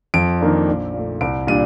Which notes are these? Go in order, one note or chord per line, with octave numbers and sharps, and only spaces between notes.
F2 D7
D#3 A#3 D4
A#1
A#2 A3
C2 D7
A#2 G3 D4 D#7